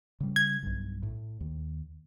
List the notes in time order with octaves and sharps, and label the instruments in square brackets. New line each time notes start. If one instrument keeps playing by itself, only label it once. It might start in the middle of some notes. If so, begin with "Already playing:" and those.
[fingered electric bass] C#3 G3
[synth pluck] G#6
[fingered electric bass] B1 G2
A2
D#2